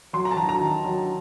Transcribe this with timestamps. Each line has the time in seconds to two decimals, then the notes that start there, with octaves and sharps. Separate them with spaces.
0.13 F#3 C6
0.25 A#5
0.31 A5
0.36 F#3 A#5
0.49 A#5
0.60 D#3
0.85 F#3